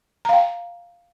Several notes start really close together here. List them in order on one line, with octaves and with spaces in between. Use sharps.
A#5 F5 G5